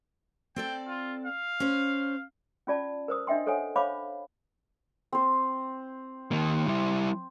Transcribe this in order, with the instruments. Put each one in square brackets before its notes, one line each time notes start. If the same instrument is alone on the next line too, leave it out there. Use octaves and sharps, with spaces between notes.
[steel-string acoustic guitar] C4 A4 D5 [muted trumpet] G5
[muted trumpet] F4
F5
[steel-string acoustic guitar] C#4 C5
[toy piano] C#4 F4 D5 A5
A#4 C5 D#6
D4 D#5 E5 G5 C6
A4 C5 C#5 F#5 G#5
C5 C#5 F5 B5 D6
[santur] C4 C5
[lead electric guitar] D#3 A#3
G3 E4